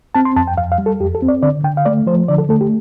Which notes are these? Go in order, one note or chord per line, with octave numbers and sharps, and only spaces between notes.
C4 A5
C6
F2 A5
G5
F2 F5
F5
G3
A4
F2 G4
A4
C4
D5
D3 D5
D3 G5
F5
A3 D5
F3 C5
D3 D5
A4
A3 A4
G4